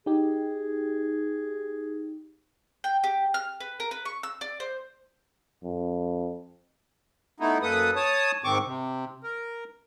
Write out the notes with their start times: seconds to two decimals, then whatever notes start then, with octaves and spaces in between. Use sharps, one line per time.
0.06 D#4 G4 G#4
2.84 G5
3.04 G4
3.34 F6
3.60 B4
3.80 A#4
3.91 B4
4.05 C#6
4.23 E6
4.41 D5
4.60 C5
5.64 F2
7.40 A3 B3 D#4 E4
7.62 F#2 A#3 A4 B4 D#6
7.96 C#5 A5 D#6
8.44 G#2 D#3 C4 C#6 D6
8.65 C3
9.23 A#4